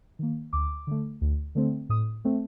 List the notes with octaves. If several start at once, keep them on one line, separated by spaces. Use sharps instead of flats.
D#3 A#3
D2 D6
D3 A3
D2
D3 A3 C4
A2 D#6
A3 C4